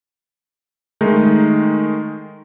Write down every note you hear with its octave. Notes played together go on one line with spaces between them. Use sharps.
D#3 G#3 A3 D#4